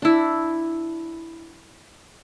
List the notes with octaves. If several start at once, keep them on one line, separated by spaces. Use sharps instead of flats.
D4 E4